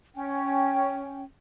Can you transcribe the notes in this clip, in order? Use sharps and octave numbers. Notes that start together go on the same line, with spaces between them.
C#4 G5